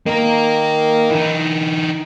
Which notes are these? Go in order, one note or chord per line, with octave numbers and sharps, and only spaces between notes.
D#3 A#3 A#4
E3 D#4